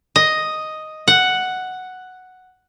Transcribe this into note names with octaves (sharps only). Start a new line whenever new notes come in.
D#5
F#5